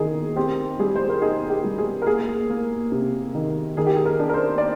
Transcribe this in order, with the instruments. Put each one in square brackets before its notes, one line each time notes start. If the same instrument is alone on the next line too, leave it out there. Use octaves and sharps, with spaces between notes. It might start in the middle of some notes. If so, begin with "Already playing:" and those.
Already playing: [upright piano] D#3 G#4
C4 G4
G3 G#4
C5
A#4
D#4 G#4
G4
G3
G#4
A#4
A#3 G#4
A#3
C3
D#3
D#3 G#4
G4
G#4
A#4
D4
A#4
C5
D5